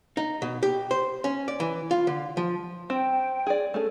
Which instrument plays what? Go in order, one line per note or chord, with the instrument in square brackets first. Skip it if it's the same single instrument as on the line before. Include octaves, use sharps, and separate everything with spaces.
[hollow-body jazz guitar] D#4
B2
G4
C5
C#4
D5
E3
F4
D3
F3
[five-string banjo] C4 [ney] G5
[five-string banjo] G#4 D5
[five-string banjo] A3 C#4 G#4 [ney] A4